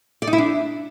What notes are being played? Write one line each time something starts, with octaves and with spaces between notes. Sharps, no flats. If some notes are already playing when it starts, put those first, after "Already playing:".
D5
D#4
E4
D4